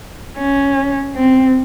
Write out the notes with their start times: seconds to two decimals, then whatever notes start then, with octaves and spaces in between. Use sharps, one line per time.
0.37 C#4
1.15 C4